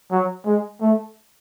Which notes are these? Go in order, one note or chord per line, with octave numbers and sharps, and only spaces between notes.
F#3
G#3
A3